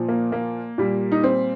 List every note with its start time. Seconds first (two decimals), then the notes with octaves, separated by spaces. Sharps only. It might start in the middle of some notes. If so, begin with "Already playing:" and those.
Already playing: A#2 F3
0.09 A#3
0.32 A#3
0.78 A#2 G3
1.12 D#4
1.24 C4